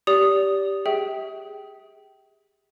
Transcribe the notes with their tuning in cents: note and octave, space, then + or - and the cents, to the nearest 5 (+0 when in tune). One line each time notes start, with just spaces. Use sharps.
G4 +0 D5 -30 D#6 -5
G#4 +0 E5 -30 G5 -20